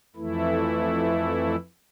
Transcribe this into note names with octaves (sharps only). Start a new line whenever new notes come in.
F2 E3 A3 E4